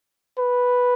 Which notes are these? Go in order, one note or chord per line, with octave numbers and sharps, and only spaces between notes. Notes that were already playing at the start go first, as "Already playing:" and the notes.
B4